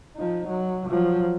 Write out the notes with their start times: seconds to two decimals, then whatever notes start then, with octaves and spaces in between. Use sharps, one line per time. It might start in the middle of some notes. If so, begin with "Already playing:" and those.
0.16 F3 D#4
0.48 F#3
0.89 F3 F#3